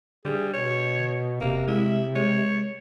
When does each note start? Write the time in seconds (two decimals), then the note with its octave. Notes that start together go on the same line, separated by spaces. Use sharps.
0.25 D3 G3 G#4
0.53 B2 C#5
1.41 E1 C3 A#3
1.68 G#3 E4
2.15 G#3 C#5